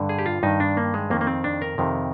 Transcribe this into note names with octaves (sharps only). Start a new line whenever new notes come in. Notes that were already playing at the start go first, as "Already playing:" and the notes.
Already playing: G2 D3
G#4
G4
F4
G2 D#3 D#4
D4
A#3
G#3
F2 D#3 A#3
A#3
C4
D4
A#4
F2 C3 D#3